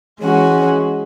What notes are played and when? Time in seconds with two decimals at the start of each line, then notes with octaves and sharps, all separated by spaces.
0.21 E3 G#3 C#4 F#4